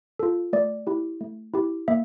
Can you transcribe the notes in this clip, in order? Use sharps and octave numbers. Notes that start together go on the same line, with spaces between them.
F4 A4
A3 D5
E4 G4
A3
E4 G4
A#3 E5